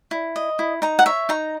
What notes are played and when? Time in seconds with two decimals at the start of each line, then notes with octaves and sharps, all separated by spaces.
0.11 E4
0.36 D#5
0.59 E4
0.82 D#4 A#5
0.99 F#5
1.06 C#5 E5
1.29 D#4 A#5